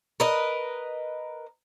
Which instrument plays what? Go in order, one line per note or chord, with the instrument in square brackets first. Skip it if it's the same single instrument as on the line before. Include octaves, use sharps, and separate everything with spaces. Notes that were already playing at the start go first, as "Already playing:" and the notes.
[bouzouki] A#4 B4 D#5